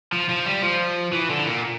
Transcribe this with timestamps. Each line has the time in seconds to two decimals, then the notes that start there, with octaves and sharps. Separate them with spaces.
0.13 F3
0.29 F3
0.46 G3
0.63 F3
1.13 E3
1.30 D3
1.46 A#2